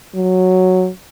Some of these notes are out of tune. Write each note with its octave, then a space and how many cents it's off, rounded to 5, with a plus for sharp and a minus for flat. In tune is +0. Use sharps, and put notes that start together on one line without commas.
F#3 -5